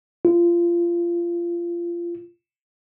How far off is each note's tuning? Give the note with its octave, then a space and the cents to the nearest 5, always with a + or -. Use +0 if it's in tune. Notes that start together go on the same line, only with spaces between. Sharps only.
F4 -25